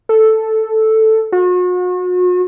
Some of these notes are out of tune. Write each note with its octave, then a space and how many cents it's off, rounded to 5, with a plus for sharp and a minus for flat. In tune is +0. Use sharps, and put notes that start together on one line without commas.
A4 +0
F#4 -40